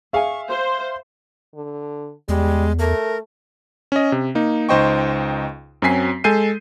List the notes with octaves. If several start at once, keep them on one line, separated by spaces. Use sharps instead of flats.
G#4 E5 F5 G#5 C#6
C5 C6
D3
E2 G3 G#3
A3 A#4
C#4 D#5
C3
A#3 D#4
C#2 D#4 C5 D#5 G5 C#6
F#2 F#3 C4 G#5 B6 C7
G#3 A4 G#5 G6 C7 D#7